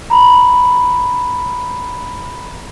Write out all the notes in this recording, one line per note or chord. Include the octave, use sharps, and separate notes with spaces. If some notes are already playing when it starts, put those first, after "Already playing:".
A#5 B5